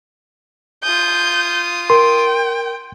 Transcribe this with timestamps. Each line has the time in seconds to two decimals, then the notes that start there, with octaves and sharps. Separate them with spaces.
0.84 F4 D#6 G6
1.90 A#4 G5 C6